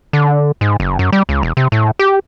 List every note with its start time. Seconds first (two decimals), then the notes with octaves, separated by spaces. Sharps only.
0.13 D3
0.61 G#2
0.80 F#1
0.99 F#2
1.13 G3
1.29 C#2
1.43 E1
1.57 C3
1.72 A2
1.99 G4